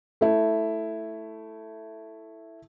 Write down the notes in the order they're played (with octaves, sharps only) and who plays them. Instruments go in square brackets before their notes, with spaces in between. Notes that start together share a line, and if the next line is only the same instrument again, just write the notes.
[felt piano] A3 E4